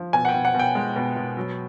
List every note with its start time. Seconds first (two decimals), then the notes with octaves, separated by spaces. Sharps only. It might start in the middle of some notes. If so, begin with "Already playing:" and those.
Already playing: F3
0.13 B2 G#5
0.25 F#5
0.29 G5
0.34 B2
0.45 F#5
0.54 B2
0.59 G5
0.75 G#3
0.96 B2
1.16 B2
1.37 F#3